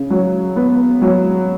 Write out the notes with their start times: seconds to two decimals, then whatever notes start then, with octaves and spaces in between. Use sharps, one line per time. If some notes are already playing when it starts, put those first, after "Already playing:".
Already playing: C#3
0.10 F#3
0.56 B3
1.02 F#3